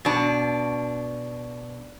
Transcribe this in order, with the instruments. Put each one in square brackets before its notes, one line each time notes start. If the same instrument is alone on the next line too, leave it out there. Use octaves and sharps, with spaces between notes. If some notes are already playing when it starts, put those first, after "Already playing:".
[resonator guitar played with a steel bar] B2 D4